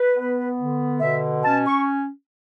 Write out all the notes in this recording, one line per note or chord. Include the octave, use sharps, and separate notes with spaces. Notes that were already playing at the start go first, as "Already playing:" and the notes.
Already playing: B4
B3
D3
B2 E5
C#4 A5
C#6